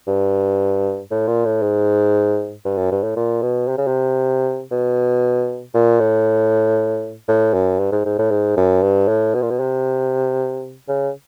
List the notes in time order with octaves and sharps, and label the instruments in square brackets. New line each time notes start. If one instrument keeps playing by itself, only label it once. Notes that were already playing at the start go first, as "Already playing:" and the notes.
[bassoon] G2
A2
A#2
A2
G#2
G2
F#2
G2
A2
A#2
B2
C3
C#3
C3
B2
A#2
A2
A2
F#2
G2
G#2
G#2
A2
G#2
F#2
G2
A2
B2
A#2
B2
C3
C#3